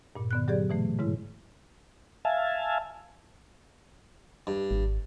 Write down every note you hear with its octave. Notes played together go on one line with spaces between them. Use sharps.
G2 A#2
D3 B3 F#6
F#3 G4 G#4 D5
B2 E3 A3
G#2 C#3 G#3 E4
E5 F5 G#5 A5
G2
G#1